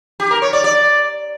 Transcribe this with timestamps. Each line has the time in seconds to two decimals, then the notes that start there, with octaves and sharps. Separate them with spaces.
0.20 G4
0.31 A#4
0.42 C#5
0.53 D5
0.64 D5